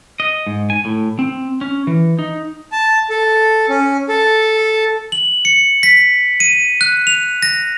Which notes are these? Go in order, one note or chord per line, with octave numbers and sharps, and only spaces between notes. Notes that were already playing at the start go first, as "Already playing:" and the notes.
D#5
G#2
G#5
A2
C4
C#4
E3
D#4
A5
A4
C#4
A4
F#7
C#7
B6
D#7
F#6
F7
A#6